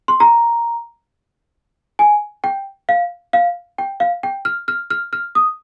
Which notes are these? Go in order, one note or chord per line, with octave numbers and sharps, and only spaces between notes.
C6
A#5
G#5
G5
F5
F5
G5
F5
G5
F6
F6
F6
F6
D#6